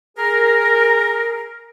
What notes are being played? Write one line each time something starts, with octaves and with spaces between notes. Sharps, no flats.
G#4 A#4